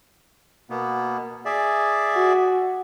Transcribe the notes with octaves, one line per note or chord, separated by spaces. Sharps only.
B2 A#3 B3
G#4 D5 E5
F#4